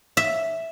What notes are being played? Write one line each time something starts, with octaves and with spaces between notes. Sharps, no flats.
E5